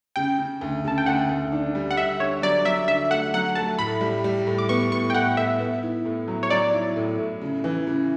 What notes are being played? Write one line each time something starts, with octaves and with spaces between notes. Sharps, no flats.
C#3 G5
C#3
D2
C#3 A5
G5
D2 F#5
D2
D4
G3
F#5
D3 E5
D3 C#5
F#3 D5
F#3 E5
D3 E5
A3 F#5
F#3 F#5
A3 A5
A2 B5
G3
G3
A2
D6
B3 C#6
A2 C#6
G5
A2 F#5
A2 E5
B3
E4
A2
F#3
C#5
F#3 D5
E4
A2
A2
C#3
E3
C#3